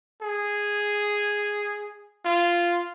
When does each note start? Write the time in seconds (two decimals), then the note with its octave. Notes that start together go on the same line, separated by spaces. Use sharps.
0.22 G#4
2.25 F4